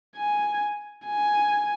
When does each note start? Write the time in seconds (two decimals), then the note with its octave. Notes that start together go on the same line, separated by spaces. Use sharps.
0.16 G#5
1.07 G#5